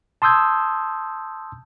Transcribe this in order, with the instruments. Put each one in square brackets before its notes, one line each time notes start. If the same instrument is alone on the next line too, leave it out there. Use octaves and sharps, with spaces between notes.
[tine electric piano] A5 C6 D#6 E6 G6 G#6